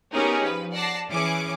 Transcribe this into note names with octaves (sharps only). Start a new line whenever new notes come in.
B3 C#4 D#4 G4 G#4 A#4
F3 B4
D5 F#5 A5 A#6 C7
E3 C#4 G#4 D6 C#7